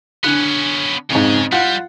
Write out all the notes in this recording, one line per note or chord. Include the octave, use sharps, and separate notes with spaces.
D3 B3 C#4 F#6
F2 G#2 C#3 C#5
G3 F4 F#5